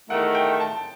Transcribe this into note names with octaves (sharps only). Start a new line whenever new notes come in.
E2 D#3 A3 F#5
G5
A5